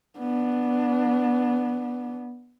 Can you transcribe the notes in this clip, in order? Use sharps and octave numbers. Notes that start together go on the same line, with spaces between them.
B3 D4